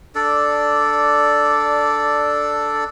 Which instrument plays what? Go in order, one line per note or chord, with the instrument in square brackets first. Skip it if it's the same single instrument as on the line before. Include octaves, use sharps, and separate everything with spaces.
[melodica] D4 A4 D5